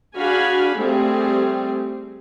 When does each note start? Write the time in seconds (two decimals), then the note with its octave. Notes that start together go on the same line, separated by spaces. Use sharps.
0.17 D4 F#4 G#4 F5 G#5 B5
0.76 G3 A3 C4 G#4